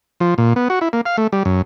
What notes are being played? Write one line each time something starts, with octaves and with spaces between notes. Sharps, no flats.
F3
A#2
B3
F#4
E4
A#3
F5
A3
G3
F#2